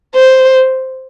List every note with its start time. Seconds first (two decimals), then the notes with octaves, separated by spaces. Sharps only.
0.15 C5